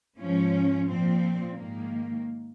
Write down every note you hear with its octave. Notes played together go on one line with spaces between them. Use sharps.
G#2 F3 C#4
A#2 F3 C4
G#2 D#3 A#3